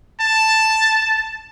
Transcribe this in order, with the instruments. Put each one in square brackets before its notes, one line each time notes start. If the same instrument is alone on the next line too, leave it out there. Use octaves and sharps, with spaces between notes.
[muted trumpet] A5